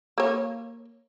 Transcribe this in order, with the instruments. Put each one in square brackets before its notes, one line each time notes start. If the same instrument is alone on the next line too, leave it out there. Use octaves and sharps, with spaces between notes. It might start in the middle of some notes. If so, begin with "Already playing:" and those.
[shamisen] A#3 C#5